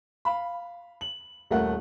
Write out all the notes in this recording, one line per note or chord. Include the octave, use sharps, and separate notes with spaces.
F5 B5
F#7
D#1 A3 A#4 F#5